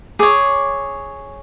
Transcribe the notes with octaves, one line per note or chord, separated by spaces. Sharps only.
G#4 C#5 D6